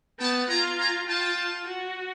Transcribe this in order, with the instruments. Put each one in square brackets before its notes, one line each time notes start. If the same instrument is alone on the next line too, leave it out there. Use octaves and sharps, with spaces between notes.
[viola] B3 [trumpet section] G5 A5
[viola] F4 [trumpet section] G#5 A#5
[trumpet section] G#5 A#5
[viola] F4 [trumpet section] G5 A5
[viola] F#4